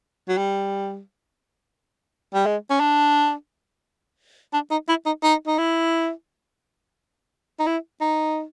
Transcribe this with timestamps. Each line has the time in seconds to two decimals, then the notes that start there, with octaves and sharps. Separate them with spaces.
0.28 F#3
0.37 G3
2.34 G3
2.46 G#3
2.70 C#4
2.80 D4
4.54 D4
4.71 D#4
4.89 E4
5.06 D#4
5.23 D#4
5.47 D#4
5.58 E4
7.60 D#4
7.66 E4
8.01 D#4